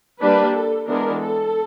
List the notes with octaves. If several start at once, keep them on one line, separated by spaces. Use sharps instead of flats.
G3 A#3 D4 B4
A4
E3 G#3 B3 D4 A#4
A4